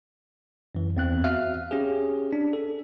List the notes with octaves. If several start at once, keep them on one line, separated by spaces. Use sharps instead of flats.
F#2 E3
E2 C4 F#6
F#4 E5 F5 F6
C#4 G4 G#4
D4
A4